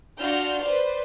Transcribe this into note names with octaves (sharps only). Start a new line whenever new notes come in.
D4 F4 F#4 F6 G6
B4 C5 D5